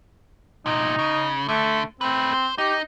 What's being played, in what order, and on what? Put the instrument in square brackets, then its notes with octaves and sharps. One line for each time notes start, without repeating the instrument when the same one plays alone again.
[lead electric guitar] C2 A#2 [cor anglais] D#4
[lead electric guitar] C#3
[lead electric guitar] D3 [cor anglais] A3
[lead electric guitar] A3 B4 [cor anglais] C4
[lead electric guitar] C5
[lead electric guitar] D#4 [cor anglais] G4